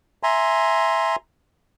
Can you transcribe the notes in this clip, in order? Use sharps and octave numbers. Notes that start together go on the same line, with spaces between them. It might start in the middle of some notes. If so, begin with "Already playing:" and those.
E5 G#5 A#5 C6